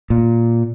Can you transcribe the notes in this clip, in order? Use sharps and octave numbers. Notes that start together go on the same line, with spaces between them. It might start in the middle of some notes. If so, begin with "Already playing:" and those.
A#2